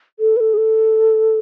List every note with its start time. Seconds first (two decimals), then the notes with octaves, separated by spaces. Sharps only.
0.19 A4
0.36 B4
0.40 A4
0.53 G#4
0.57 A4